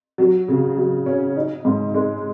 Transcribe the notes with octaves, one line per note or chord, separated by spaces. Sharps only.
F#3
C#3
F#3
C#4
D#4
G#2
G#3